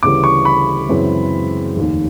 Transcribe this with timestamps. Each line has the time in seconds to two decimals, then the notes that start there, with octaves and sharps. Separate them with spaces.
0.03 D2 C#3 E3 G3 D6
0.24 C#6
0.45 B5
0.89 F#2 C#3 E3 G#3 C4
1.76 F1 D#2 D#3